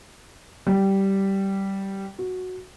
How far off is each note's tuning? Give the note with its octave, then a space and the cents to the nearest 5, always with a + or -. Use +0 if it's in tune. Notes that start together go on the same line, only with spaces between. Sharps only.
G3 -10
F#4 -5